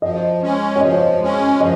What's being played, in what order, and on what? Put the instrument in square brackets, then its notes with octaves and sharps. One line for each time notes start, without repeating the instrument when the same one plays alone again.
[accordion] F3 [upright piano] D#5
[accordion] G#3 C#4
[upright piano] C#5
[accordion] F3 [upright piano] D#5
[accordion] G#3 C#4
[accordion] F3 [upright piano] D#5